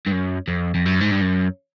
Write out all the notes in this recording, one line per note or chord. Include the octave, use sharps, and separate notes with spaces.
G2
F#2
F2
F2
F#2
G#2
G2
F#2